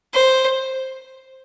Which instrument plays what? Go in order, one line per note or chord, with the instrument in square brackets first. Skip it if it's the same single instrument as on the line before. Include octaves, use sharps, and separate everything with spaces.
[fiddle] C5